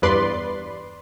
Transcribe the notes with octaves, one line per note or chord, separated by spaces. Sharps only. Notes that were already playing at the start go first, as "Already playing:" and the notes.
E2 G2 B4 D5 C6